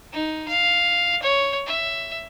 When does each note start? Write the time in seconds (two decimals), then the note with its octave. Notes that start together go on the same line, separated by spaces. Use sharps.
0.12 D#4
0.48 F5
1.23 C#5
1.66 E5